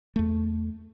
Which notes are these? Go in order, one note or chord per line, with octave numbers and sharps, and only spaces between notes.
E2 A3